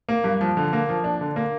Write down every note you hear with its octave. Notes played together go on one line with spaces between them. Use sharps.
A#3
G2
F3
D3
A#3
F3
D4
D3
A#3